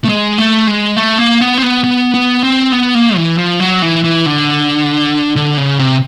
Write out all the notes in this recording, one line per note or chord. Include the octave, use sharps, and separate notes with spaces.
A3
G#3
A3
G#3
A3
A#3
B3
C4
B3
B3
B3
C4
B3
A#3
E3
F3
F#3
E3
E3
D3
D3
C#3
C3